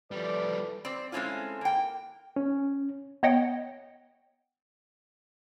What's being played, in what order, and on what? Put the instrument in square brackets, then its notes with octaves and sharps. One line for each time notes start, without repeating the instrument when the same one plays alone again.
[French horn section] E3 A4 B4 [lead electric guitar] F3 G3 [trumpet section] D5
[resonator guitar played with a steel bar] C4 D5
G#3 A3 C4 C#4 E4 F4
A#3 G5
[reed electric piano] C#4
[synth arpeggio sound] B3 C#5 D#5 F#5 G5